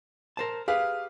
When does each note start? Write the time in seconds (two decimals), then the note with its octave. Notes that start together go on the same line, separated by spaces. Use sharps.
0.37 A#4 C5 A5
0.68 G4 G#4 B4 F5